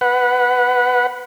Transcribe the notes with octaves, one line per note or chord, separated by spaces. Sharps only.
B4 F#5